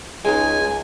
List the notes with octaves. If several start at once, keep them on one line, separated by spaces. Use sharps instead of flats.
C#2 G#3 D#4 G#5